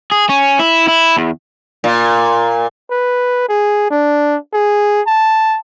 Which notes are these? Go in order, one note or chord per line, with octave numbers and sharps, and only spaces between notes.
G#4
C#4
E4
E4
E2
A#2
B4
G#4
D4
G#4
A5